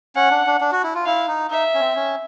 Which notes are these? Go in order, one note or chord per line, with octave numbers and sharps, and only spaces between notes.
C#4 F#5
D4
D4
D4
F#4
E4
F4
E4 F5
D#4
D#4 E5
C#4
C4
C#4